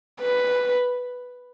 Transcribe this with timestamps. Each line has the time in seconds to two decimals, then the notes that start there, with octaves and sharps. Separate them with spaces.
0.21 B4